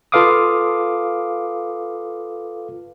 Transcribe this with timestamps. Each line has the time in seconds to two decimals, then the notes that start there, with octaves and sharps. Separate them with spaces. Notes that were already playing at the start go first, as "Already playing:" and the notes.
0.12 F4 A4 B4 F5 D6 D#6